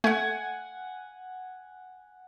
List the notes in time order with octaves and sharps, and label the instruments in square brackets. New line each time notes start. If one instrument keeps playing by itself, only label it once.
[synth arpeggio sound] A3 [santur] F#5 G#5